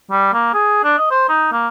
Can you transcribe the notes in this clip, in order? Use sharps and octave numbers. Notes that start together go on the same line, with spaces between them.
G3
A#3
G#4
D4
D#5
C5
D#4
A#3